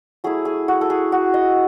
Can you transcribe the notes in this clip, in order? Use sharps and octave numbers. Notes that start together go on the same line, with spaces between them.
F#3 A3 E4 G#4
G#4
F#4
A4
G#4
F#4
D#5